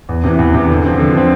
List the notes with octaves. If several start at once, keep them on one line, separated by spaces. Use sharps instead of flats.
E2
C3 E3
E2
C3 E3
D3
F3 C4
D3
F3 C4